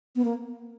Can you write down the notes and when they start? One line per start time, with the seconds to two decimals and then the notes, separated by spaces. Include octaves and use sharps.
0.16 B3
0.25 A#3